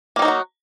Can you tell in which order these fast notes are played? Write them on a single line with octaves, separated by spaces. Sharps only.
A#3 G3 D#4 F#3 F#4